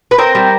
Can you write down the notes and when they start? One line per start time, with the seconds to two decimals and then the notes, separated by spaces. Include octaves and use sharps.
0.11 B4
0.18 C4 A#4 C5
0.35 G3